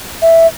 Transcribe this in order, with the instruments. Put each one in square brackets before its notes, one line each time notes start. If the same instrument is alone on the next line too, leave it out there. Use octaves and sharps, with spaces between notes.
[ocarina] E5